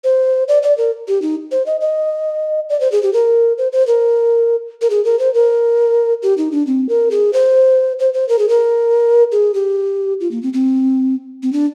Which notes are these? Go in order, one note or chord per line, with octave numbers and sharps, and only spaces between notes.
C5
D5
D5
A#4
G4
D#4
C5
D#5
D#5
D5
C5
G#4
G4
A#4
C5
C5
A#4
A#4
G#4
A#4
C5
A#4
G4
D#4
D4
C4
A#4
G#4
C5
C5
C5
A#4
G#4
A#4
G#4
G4
F4
A#3
C4
C4
C4
D4